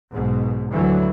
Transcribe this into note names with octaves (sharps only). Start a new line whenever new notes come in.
B1 G#2 B2
D2 D3 E3 F#3